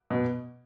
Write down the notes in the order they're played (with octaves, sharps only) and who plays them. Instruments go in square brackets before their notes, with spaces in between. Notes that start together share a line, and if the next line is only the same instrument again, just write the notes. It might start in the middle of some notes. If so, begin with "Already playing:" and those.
[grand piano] B2